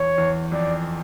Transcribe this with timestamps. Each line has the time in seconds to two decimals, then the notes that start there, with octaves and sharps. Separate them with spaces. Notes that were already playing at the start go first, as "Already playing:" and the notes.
Already playing: E2 C#5
0.18 E2
0.52 F2 D5